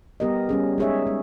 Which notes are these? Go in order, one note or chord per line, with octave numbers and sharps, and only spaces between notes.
G3 B3 G4 A#4 D#5
G3 C#4 G#4
G#3 D#4 G#4 C#5 E5
G#3